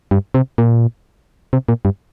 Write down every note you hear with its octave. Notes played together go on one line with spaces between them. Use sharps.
G2
C3
A#2
C3
A#2
G2